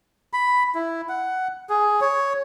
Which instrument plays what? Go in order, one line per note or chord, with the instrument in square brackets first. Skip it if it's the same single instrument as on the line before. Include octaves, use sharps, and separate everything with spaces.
[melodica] B5
E4
F#5
G#4
C#5